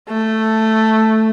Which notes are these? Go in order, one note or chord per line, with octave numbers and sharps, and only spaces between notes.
A3